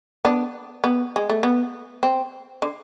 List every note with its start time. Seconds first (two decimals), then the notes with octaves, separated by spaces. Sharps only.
0.25 B3 D4
0.84 B3
1.16 G#3
1.29 A3
1.43 B3
2.03 C4
2.62 D3